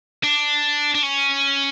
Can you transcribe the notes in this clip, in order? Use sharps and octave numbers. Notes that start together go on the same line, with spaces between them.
D4
D4
C#4